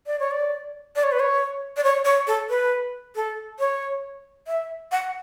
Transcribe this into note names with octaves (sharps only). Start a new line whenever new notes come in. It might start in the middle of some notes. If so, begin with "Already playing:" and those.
D5
C#5
D5
D5
C#5
B4
C#5
D5
C#5
C#5
A4
B4
A4
C#5
E5
F#5